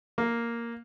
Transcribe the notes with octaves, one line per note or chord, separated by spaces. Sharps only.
A#3